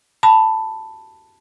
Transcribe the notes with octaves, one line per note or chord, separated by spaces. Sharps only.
A5 B5